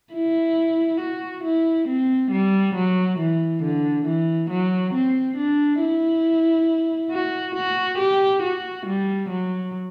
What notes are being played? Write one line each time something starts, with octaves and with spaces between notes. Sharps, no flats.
E4
F#4
E4
C4
G3
F#3
E3
D3
E3
F#3
C4
D4
E4
F#4
F#4
G4
F#4
G3
F#3